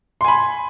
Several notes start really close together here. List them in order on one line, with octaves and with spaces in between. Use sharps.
C6 G#5 B5